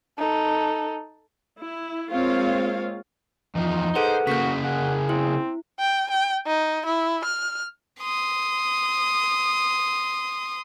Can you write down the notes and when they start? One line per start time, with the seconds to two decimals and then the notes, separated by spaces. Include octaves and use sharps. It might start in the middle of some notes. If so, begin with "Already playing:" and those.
0.18 D#4 A4
1.57 E4
2.11 G#3 A#3 C4 F4 C#5 F5
3.55 E2 F3 D#4
3.96 G#4 A4 B4 C5 F#5
4.27 C#3 A#3 F#4 G6 B6
4.64 G#4 F#5
5.09 C4 E4
5.80 G5
6.10 G5
6.47 D#4
6.86 E4
7.24 F6
8.01 C6 D#6